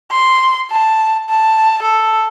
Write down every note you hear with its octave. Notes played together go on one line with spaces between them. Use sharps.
C6
A5
A5
A4